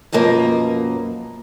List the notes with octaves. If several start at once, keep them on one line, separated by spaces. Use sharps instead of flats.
F#2 B2 F3 A#3 D#5